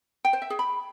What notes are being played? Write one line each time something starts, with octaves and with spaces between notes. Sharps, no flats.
G5
C5
E5
G#4
B5